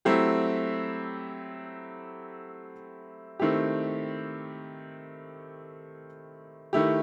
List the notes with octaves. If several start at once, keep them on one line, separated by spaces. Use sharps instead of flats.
F#3 A3 C4 E4 G4
D#3 A3 C4 E4 G4
D#3 A3 E4 G4